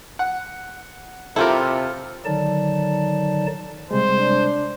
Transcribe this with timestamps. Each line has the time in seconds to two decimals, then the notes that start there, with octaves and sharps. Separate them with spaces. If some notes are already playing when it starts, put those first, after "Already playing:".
0.19 F#5
1.36 C3 E4 F4 G4 A4 A#4
2.25 D3 D#3 F#3 D#4 D5 A5
3.91 C3 G3 G#3 C5
4.19 D4